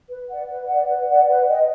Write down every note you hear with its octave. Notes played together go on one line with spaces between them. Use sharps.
B4
D5 F#5
B4
D5 F#5
B4
D5 F#5
B4
D#5 G5